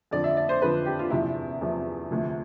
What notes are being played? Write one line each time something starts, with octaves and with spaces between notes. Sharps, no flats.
F2 D3 F3 D5
E5
D5
C5
F2 D3 F3 B4
G4
F4
E2 C3 F3 E4
E2 C3 F3
D2 C3 F3